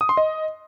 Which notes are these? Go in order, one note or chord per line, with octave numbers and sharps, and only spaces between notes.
D#6
C6
D#5